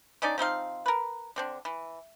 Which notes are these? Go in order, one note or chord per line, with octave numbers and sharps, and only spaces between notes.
D3 C#4 D#4 D5
F3 C4 D#4 F5
A#4 B4
D3 C4 D4
E3